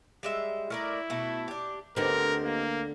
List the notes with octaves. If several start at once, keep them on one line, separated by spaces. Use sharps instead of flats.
G3 G#3 E5
A3 E4 A#4 D5
B2 A3
D4 G4
D2 D3 B3 C4 D#4 G4 A#4
A#3